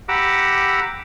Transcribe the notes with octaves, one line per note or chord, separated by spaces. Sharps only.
G4 F#5 A#5 B5 D6 E6